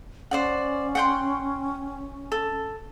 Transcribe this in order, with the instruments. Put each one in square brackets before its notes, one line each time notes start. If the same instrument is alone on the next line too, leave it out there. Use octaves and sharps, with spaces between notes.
[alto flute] C#4 [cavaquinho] C5 D5 F#5
[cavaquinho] F#5 G5 C6
A4